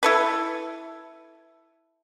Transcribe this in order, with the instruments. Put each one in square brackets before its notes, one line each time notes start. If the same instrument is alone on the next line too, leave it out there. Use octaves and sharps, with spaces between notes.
[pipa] E4 A4 B4